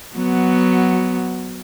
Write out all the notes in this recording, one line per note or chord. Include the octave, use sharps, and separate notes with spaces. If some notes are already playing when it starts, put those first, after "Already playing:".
F#3 B3